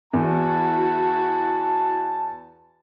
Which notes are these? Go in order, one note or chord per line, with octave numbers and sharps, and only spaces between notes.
E2 E4 F#4 A5